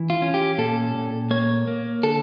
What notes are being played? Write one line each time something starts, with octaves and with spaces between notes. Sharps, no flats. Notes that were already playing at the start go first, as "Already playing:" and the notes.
Already playing: E3
F4
C#4
G4
A#2 A4
A#2
A#3 C#5
A#3
D3 A4